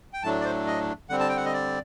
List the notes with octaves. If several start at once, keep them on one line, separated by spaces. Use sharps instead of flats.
G5
A2 F#3 A3 D4 A5
D5
C5
D#5
D3 G3 C4 F#5
A5
G5
F#5
D#5
D5